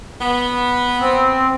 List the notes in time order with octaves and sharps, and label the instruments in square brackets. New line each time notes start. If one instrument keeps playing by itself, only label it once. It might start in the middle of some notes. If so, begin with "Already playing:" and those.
[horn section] B3
[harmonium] C4